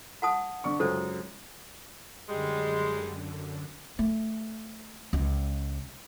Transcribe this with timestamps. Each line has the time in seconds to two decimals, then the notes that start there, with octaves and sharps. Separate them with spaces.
0.22 F#5 A5 D#6
0.64 D3 D4 C#6
0.80 C#2 F#2 D4 A4 C5
2.29 F#2 D3 G3 G#3
3.99 A3
5.13 C#2